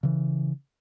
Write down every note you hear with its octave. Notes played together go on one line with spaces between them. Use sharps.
C#3 E3